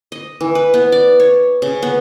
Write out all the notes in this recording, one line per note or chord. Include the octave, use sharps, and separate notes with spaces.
D#5
E3
B4
B3
D5
C#5
C#3
B3